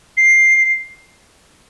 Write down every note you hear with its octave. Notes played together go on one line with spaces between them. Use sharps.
C7